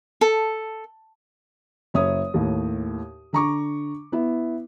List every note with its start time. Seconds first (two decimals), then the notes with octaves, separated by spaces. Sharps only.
0.21 A4
1.94 F#1 C#5 E5 D#6
2.34 D#2 A2
3.33 D3 A#5 C#6 D6
4.12 B3 E4